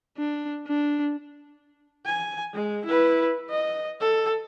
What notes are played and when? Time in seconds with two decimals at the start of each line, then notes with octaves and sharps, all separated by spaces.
0.17 D4
0.67 D4
2.06 G#5
2.54 G#3
2.85 E4 B4
3.50 D#5
4.00 A4